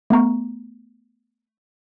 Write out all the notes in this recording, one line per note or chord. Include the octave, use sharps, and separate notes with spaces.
A3 B3 A#5 C#6